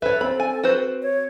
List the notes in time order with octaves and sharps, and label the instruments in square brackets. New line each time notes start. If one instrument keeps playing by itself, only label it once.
[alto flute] A4 [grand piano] B4 [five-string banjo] C#5 E5
[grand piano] C4 [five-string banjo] B5
[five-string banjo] G#5
F#4 B4 C5
[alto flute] C#5